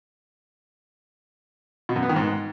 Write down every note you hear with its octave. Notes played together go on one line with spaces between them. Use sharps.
B2
F#2
B3
D#3
G#2